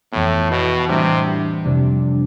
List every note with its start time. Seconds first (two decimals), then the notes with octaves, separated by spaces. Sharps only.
0.13 F2 A2 E3 B3
0.51 B2
0.88 A2 C3 E3 G3 D4
1.64 F2 C3 G3 D4